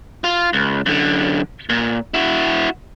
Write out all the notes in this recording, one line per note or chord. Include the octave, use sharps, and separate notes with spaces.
F4
C#2
F#2 D3
A#2
E4 F#4